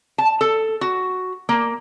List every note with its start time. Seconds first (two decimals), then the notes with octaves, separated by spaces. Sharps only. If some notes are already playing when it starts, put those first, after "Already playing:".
0.18 A5
0.41 A4
0.81 F#4
1.49 A#3